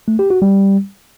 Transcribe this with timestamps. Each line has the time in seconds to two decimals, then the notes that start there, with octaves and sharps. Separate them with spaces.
0.08 A3
0.19 G4
0.30 F#4
0.42 G3